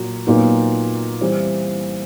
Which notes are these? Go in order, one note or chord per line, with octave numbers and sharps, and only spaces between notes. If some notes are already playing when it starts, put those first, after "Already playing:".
Already playing: A#2 F#3
A#2 F#3 B3 D#4
E3 G3 C4 E4